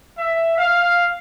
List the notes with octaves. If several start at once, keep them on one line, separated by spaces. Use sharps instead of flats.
E5
F5